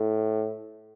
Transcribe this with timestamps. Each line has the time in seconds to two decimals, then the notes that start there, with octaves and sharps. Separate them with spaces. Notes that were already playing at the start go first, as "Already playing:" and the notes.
Already playing: A2